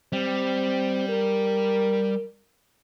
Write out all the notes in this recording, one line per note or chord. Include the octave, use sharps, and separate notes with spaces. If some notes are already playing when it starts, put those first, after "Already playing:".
G3 C4
A#4